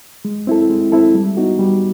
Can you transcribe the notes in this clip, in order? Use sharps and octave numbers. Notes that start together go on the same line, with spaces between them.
G#3
C4 E4 A4
G#3
C4 E4 A4
G3
B3 D#4 F#4
G3